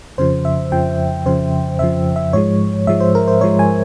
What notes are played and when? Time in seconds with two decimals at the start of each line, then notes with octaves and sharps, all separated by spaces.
0.18 F2 C#3 F3 C5
0.45 E5
0.72 F2 C#3 F3 G5
1.26 F2 C#3 F3 C5
1.79 F2 C#3 F3 E5
2.16 E5
2.33 G#2 F3 G#3 C#5
2.87 G#2 F3 G#3 E5
3.01 C5
3.15 A#4
3.28 C5
3.41 G#2 F3 G#3 C#5
3.59 G#5